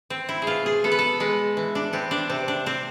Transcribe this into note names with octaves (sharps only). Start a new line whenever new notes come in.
C4
E4
G#4
B2 F4
G#4
B3 A4
B4
A4
G#3 B4
E3
D4
B3 C4
D4
C3 C4
D4
C3 C4